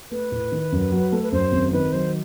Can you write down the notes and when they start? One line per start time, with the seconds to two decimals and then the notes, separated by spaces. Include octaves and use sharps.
0.11 A3 B4
0.32 A2
0.52 D#3
0.72 F#2
0.92 F#3
1.12 A3
1.23 B4
1.32 F#2 C5
1.52 G#1
1.73 D#3 B4
1.93 F#3 C5